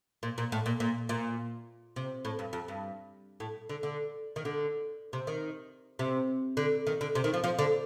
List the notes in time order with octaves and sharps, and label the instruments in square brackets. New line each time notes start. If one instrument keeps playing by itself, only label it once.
[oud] A#2
A#2
A2
A#2
A#2
A#2
C3
A2
G2
F2
G2
A2
D3
D3
D#3
D3
C3
D#3
C3
D3
D#3
D3
C3
D#3
F3
F3
D3